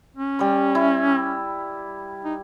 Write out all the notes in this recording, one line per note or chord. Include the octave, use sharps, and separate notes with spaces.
C#4
G3 B5
E4
D#4